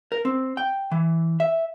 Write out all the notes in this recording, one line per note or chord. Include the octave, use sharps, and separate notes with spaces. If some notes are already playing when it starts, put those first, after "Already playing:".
A#4
C4
G5
E3
E5